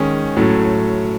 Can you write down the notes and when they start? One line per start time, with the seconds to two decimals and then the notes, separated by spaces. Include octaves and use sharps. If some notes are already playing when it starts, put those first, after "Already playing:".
Already playing: D#3 G#3 C#4
0.37 A2 F#3 A3 C#4